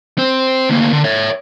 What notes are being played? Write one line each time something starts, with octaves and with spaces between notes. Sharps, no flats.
C4 C5
D2 A#3
D3
C#5 E5